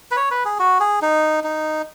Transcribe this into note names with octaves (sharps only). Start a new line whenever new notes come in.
B4
C#5
B4
G#4
F#4
G#4
D#4
D#4